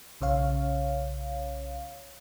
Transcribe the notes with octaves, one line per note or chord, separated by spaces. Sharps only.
B1 C#3 C#5 F5